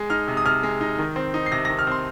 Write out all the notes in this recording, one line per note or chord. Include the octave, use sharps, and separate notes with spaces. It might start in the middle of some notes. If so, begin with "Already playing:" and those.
Already playing: G#3
D#4 F6
C3
D#6
C3 F6
G#3
D#4
D#3
C4
D#4
C7
C3 A#6
A#6
D#3
F6
C4 C6